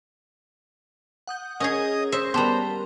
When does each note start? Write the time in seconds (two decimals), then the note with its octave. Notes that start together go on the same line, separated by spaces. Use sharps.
1.27 F#5 D#6 G6
1.60 C#4 G#4 A#4 C#5 D#5 D#6 G#6
2.12 C5 C#5 E5 A#6 C7
2.34 G3 B3 G4 A#4 A5 C6